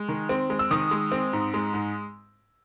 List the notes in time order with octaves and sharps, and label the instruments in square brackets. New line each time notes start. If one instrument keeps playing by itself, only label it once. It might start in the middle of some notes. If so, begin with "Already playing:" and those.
Already playing: [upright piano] G#3
D#3
C4
G#3
E6
D#3 D#6
G#3
C4
G#2
G#3
G#2